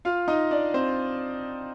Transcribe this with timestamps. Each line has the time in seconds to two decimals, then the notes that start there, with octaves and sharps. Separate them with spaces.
0.05 F4 F5
0.28 D#4 D#5
0.51 D4 D5
0.74 C4 C5